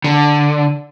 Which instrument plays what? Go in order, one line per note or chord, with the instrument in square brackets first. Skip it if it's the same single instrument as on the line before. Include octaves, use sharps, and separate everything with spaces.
[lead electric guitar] D3